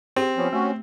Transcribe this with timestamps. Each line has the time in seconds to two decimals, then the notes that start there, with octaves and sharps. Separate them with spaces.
0.16 C4 G4 G#4
0.37 F3 B3 C#4
0.53 A3 C#4 F#4